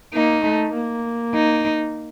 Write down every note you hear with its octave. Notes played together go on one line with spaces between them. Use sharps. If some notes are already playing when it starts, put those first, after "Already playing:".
A#3 D#4
A3
A#3
D#4